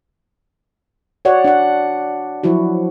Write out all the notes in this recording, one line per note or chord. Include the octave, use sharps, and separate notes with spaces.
F#4 C#5 D5 F#5
D4 C#5 F#5
F3 F#3 E4 F#4